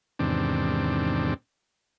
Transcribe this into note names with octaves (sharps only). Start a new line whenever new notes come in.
E2 G#2 C3 D#3 C4 D4